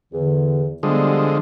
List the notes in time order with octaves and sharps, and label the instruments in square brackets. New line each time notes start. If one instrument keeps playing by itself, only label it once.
[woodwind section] E2 D3
[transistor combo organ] D3 F3 G#3 [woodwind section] G3 B3